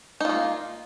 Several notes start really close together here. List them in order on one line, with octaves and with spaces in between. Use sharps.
D#4 F4 A#3